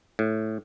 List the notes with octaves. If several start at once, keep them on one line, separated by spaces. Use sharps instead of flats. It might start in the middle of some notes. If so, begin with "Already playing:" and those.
A2